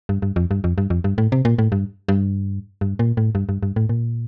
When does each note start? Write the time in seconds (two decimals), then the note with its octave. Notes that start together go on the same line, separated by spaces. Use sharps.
0.09 G2
0.22 G2
0.36 F2
0.51 G2
0.64 F2
0.78 G2
0.90 F2
1.04 G2
1.18 A2
1.32 C3
1.45 A#2
1.59 A2
1.72 G2
2.08 G2
2.81 G2
2.99 A#2
3.17 A2
3.35 G2
3.49 G2
3.63 G2
3.76 A2
3.89 A#2